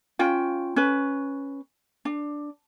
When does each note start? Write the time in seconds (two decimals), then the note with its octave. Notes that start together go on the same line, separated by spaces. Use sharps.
0.19 C#4 F4 G5
0.76 C#4 B4
2.05 D4